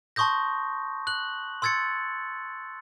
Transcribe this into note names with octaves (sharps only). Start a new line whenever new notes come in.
A5 C6 C#6 D#6 G6 A#6
F#6 F#7
C6 E6 G#6 A6 C#7